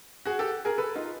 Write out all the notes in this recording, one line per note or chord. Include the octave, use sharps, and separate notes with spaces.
F#4 G#4
G4 A4
G#4 A#4
A4 B4
D#4 F4